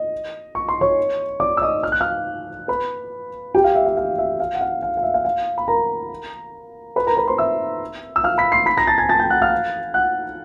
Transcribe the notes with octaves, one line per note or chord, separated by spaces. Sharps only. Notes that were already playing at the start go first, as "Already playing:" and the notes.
Already playing: D#5
C#6
C6
C#5 C#6
D5 D6
E6
D#5 D#6
F6
F#6
F5 F6
B4 B5
G4 G5
F5
E5
F5
F5
E5
F5
F#5
F5
F5
F5
E5
F5
F5
B5
A#4 A#5
B4 B5
A#4 A#5
B4 B5
C5 C6
E5 E6
E6
F5 F6
B5 B6
C6 C7
B5 B6
A#5 A#6
A5 A6
G#5 G#6
A5 A6
G5 G6
F#5 F#6
F5 F6
F#5 F#6